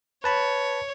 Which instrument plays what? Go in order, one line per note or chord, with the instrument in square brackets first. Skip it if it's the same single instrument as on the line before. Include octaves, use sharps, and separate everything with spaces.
[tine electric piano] B4 A5 B5 [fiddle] C#5